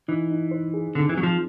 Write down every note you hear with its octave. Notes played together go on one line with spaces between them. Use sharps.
E3 D#4
D#4
C5
G#4
D3 C4
E3
F#3 C4
F3